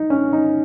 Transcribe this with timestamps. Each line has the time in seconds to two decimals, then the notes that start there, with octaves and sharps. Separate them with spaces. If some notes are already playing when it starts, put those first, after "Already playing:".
Already playing: D#4
0.10 C#4
0.33 D#4